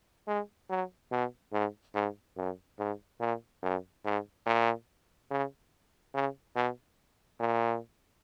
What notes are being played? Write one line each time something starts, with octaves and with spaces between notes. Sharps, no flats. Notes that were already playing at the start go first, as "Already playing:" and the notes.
G#3
F#3
B2
G#2
G#2
F#2
G#2
A#2
F#2
G#2
A#2
C#3
C#3
B2
A#2